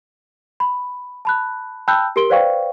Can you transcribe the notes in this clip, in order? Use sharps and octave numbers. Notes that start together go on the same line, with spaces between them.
B5
A5 B5 F#6
G5 A5 B5 E6 F#6 G6
G4 A#4 C6 D7 G7
B4 C5 D5 F5 G5 C#6